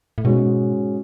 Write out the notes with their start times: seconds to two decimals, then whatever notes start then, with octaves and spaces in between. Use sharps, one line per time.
0.18 A2
0.24 G#2 B2 G#3 C#4 F#4